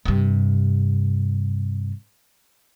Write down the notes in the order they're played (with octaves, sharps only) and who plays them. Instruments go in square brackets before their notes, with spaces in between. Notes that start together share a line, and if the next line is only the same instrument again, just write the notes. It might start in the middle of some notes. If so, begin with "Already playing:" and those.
[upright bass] G2 C3